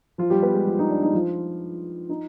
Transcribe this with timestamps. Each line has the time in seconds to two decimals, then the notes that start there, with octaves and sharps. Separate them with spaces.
0.18 F3 F4
0.30 G3 G4
0.43 B3 B4
0.54 G#3 G#4
0.67 F3 F4
0.79 D#4
0.90 D4
1.03 D#4
1.13 F3 F4
2.09 D#4